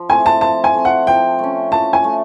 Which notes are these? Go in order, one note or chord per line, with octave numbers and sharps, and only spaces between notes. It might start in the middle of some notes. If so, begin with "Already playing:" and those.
Already playing: F3
A3 C4 G#5
A5
F3 A5
G#5
A3 C4
F#5
F3 G5
A3 C#4
F3 A5
G#5
A3